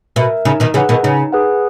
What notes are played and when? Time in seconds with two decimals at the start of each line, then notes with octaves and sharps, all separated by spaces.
0.16 B2 A#4 E5
0.45 C#3 D#4
0.60 B2 D#3
0.74 C#3 E3 G#4 B4 F#5
0.89 B2 D#3
1.03 C#3 D#4
1.32 G#4 B4 F#5